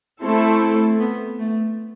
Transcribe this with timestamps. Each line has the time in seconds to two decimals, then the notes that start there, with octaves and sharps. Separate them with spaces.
0.21 A3 C4 E4 A4 C5
0.60 C4
0.99 B3
1.39 A3